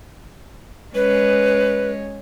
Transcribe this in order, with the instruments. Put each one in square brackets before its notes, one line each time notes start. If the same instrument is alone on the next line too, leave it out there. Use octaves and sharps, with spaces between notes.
[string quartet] G#3 C#4 [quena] B4